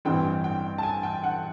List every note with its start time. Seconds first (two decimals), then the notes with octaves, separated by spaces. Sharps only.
0.05 A1 G2 E3 G3 C4 G5
0.44 G5
0.78 A5
0.83 G#5
1.03 G5
1.24 F#5